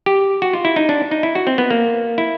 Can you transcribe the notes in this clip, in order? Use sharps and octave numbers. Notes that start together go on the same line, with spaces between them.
G4
F#4
F4
E4
D#4
D4
D#4
E4
F#4
C4
B3
A#3
E4